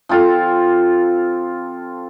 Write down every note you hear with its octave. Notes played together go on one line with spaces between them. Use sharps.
F3 C4 F4 A4